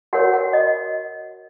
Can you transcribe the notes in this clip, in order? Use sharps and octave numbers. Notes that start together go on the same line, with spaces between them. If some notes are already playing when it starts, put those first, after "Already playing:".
F#4 A#4 C#5 F#5
F#5
D#5